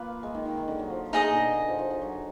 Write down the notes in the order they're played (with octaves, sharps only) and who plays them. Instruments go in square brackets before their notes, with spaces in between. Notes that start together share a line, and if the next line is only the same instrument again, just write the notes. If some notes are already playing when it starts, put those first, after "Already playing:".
Already playing: [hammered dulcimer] A#3 [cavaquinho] F4 B4
[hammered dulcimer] G#3
D#3
D#3
D#3
D3
F#3
F3
[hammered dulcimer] A#3 [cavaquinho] D#4 G#4 D#5
[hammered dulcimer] B2
D3
F3
F3
F3
F#3